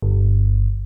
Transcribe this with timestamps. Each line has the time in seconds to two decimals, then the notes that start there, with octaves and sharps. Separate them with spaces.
0.02 G1